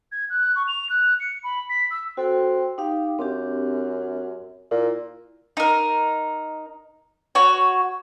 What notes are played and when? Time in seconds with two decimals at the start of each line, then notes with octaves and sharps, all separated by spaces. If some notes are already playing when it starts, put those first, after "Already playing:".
0.12 G#6
0.30 F#6
0.56 C#6
0.68 F7
0.90 F#6
1.20 C#7
1.44 B5
1.69 B6
1.91 E6
2.17 C4 F#4 A4 G5
2.78 D#4 G4 F5
3.19 F#2 C4 D4 G4
4.71 A#2 E4
5.57 D#4 A#4
7.35 F#4 C#5